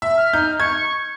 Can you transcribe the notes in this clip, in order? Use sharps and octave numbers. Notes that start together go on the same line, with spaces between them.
E5
F6
D#4 G6
C#6 G#6